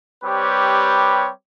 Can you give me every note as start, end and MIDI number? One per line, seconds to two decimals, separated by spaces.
0.24 1.29 55
0.24 1.29 60
0.24 1.29 67
0.24 1.29 71
0.24 1.29 73